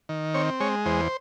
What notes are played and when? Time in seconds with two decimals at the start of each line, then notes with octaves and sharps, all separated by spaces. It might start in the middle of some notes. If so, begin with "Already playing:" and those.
0.09 D#3
0.34 C4 C#5
0.60 G#3 C#5
0.86 E2 C5